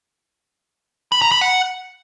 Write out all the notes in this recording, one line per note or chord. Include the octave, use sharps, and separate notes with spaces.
B5
A#5
B5
F#5